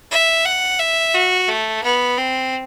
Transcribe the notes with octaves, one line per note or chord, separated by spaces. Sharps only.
E5
F#5
E5
F#4
A3
B3
C4